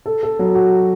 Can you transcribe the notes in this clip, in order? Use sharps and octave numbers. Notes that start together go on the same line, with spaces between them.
A4
A4
F#3
F#4